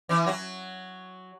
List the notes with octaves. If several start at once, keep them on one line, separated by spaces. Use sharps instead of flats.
E3 E4
F#3 F#4